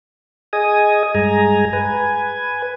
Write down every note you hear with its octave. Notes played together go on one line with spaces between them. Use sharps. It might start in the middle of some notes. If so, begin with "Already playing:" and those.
G#4 D#5 G#5 D#6
G2 G#3 G#5 A#5
B4 G#5